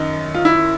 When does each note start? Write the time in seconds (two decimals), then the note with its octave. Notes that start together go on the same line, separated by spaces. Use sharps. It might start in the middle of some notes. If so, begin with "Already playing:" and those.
Already playing: F#2 D#3 D#4
0.35 F4
0.45 E4